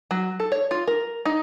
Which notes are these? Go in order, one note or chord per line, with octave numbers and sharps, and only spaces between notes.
F#3
A4
C#5
F4
A#4
D#4